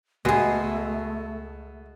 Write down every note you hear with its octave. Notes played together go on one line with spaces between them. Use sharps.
C#2 B2 G#3 A3 G#4